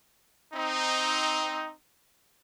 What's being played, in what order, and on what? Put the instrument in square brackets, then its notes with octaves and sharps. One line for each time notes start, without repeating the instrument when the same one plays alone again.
[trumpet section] C4 D#4